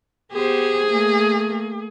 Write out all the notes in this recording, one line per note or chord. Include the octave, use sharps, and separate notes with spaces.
B3 G4 G#4 C5
A3 A#3